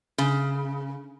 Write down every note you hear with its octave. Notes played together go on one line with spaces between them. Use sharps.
C#3